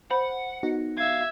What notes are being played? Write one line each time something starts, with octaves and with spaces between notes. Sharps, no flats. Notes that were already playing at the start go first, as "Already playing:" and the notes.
C5 F#5 B5
B3 D#4 F#4
E5 F5 G#6